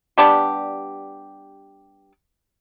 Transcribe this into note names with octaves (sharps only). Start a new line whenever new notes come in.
G3 B3 D4 G4